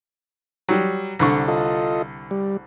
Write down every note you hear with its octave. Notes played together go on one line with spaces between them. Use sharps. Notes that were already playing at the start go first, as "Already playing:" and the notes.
F#3 G3
C2 D3 C#6
F4 A4 D#5
G3